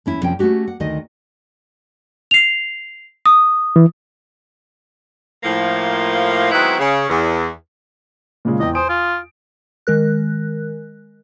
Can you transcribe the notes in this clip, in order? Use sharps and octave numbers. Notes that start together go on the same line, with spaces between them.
E2 C#4 E4
F2 C3 F3 C#4 G5
A3 C4 C#4 F#4 G4
F#5
D2 D#3 D#5
C7 F7
D#6
E3
A2 F3 A#3
D#3 F#3 G#3 B3 C4 E4
C#3
E2
A#2 C#3 G#3
E2 D#5 G5
C5 G#5 D#6 D7
F4
D#3 G#3 A#4 F#6